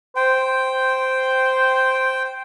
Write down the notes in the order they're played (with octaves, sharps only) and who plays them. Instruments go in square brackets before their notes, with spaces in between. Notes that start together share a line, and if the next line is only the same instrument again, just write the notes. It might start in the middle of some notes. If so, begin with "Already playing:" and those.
[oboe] C5 [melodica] G5